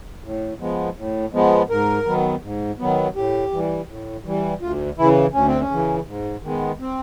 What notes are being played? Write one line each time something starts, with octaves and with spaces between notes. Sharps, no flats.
A2
F3 G#3 B3
A2
F3 G#3 B3
G#2 A#4
D#3 F#3 B3
G#2
D#3 F#3 B3
A2 G4
E3 G3
A2
E3 G3
D2 F4
C#3 E3 E4
D2 C#4
C4
C#4
C#3 E3
G#2
D#3 G#3 B3
C4